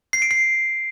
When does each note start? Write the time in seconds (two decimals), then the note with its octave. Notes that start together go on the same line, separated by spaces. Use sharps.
0.13 C7
0.22 D7
0.31 C7